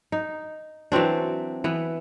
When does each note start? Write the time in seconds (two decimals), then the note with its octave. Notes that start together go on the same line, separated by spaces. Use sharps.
0.12 D#4
0.92 E3 F#3 C4 D4
1.64 E3 B3